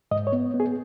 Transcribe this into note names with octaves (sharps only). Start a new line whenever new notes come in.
G#2 D#5
C#5
B3
B3
G#4